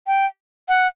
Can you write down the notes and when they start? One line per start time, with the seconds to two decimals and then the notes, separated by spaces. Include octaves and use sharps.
0.07 G5
0.69 F#5